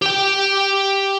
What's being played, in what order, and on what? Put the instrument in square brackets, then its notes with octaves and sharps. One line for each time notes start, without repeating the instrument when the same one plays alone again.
[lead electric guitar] G4 G5